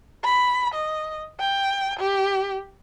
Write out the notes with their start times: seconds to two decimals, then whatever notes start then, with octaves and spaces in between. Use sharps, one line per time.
0.24 B5
0.74 D#5
1.40 G5
1.99 G4